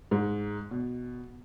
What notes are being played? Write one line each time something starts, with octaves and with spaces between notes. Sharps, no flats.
G#2
B2